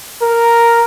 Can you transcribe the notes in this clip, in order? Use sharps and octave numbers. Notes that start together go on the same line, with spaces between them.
A#4